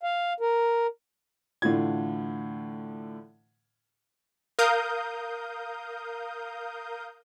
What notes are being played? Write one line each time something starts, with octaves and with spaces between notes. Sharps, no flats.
F5
A#4
A2 D3 E3 F4 G#6
A#4 F5 D#6 G6